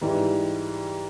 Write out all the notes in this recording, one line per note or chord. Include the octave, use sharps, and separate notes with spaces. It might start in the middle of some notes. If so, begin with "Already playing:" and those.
G#2 E3 G3